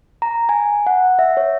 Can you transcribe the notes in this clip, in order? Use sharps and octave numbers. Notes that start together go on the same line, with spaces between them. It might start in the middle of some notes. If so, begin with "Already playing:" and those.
A#5
G#5
F#5
E5
C#5